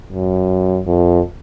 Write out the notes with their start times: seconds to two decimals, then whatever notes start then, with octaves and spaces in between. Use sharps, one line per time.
0.12 F#2
0.86 F2